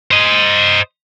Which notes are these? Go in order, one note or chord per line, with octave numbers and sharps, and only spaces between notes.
C5 D#5